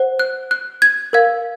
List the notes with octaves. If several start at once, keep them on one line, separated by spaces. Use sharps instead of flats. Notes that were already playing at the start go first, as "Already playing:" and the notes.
Already playing: C5 F#5
F#6
F#6
G#6
A#4 F5 G#6